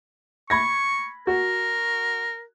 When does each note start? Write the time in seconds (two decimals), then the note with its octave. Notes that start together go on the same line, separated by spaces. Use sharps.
0.50 B5 C#6 G#6 A#6
1.27 F#4 A#4